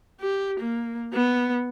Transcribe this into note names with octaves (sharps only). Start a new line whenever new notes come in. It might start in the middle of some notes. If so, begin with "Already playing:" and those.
G4
A#3
B3